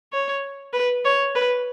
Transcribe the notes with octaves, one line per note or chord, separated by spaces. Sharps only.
C#5
B4
C#5
B4